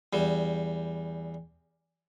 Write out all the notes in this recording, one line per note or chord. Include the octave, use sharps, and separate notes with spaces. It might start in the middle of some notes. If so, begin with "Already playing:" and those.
E2 G3